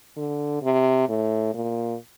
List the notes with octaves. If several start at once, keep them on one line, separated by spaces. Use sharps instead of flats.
D3
C3
A2
A#2